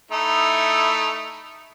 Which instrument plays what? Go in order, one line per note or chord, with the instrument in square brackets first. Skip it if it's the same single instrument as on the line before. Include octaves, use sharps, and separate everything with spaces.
[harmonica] A3 D#4 E4